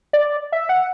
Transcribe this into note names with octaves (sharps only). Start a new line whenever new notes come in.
D5
E5
F#5